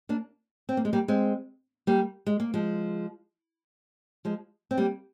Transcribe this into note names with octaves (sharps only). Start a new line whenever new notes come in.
A#3 D4
C4
A#3
G#3
G3 A#3
G#3 C4
G3 A#3
G#3
A#3
F3 G#3
F3 G#3
C4
G3 A#3